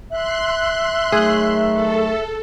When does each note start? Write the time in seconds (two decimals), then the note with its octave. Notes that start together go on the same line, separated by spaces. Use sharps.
0.10 E5 C6 F#6
1.12 D#3 F#3 A3 G#4
1.73 A4